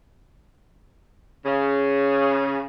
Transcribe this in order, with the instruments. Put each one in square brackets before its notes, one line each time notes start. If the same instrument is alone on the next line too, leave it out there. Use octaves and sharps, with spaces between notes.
[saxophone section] C#3